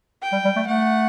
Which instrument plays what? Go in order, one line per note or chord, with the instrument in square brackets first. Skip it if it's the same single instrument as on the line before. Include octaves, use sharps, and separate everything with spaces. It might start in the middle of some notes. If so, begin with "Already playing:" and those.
[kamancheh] G5
[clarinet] G3
G3
A3
[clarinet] A3 [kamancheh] F#5